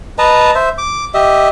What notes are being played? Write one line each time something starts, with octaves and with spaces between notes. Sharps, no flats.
B4 D#5 A5 A#5
C5 E5
D6
G4 D#5 E5